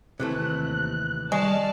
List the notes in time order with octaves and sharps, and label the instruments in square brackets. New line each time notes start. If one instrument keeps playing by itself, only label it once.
[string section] D#2 [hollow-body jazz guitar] C3 E3 A3 [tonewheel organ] F#6
[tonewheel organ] G3 D#5 C#6 [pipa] G#3 [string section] D5 A5 F6